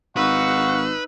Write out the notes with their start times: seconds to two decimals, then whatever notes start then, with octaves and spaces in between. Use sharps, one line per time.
0.17 G#1 D#4 B4 F5 F#5 C#6 E6